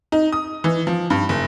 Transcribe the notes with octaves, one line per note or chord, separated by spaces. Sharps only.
D#4
D#6
E3
F3
G2
F#1